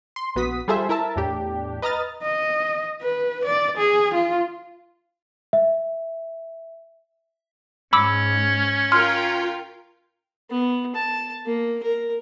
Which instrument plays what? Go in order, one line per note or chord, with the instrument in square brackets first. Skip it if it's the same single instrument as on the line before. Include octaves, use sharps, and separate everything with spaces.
[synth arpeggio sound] C6
A#1 B3 F#4 D#6 B6
G3 F4 G#4 A4 C5 E5
E4 A#4 E5 A5
E2 A2 D4 G4
B4 D#5 A#5 D#6 F6 A6
[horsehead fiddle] D#5
B4
D5
G#4
F4
[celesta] E5
[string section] G#2 [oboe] C#4 [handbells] B5 D6 E6
[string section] F4 A#4 G5 [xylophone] C6 F6
[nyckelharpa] B3
A5
A#3
A#4